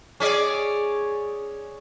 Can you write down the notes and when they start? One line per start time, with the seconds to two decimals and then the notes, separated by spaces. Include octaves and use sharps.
0.20 C#4 G#4 D5